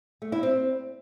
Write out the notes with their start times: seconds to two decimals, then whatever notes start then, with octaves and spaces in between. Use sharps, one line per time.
0.22 A3
0.32 E4
0.43 C4